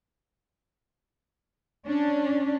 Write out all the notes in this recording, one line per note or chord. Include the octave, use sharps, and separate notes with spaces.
C#4 D4